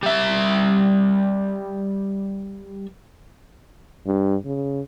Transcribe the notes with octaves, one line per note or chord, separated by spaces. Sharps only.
G3 E5
G2
C#3